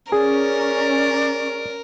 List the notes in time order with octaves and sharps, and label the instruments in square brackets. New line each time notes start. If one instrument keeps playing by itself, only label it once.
[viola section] C#4 [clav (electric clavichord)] G#4 [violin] A#4 [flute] D5